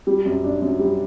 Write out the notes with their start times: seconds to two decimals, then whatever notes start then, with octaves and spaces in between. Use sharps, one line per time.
0.07 G3
0.25 F#2
0.44 D4
0.62 F#2
0.79 G3